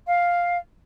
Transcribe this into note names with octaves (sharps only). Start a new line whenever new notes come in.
F5